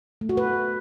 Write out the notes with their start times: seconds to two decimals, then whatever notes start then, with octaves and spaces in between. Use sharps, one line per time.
0.21 A3
0.29 F#4
0.37 B4